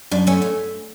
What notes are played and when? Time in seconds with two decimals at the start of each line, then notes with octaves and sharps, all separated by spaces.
0.11 F#2 D4
0.27 A3 C#4
0.42 C#4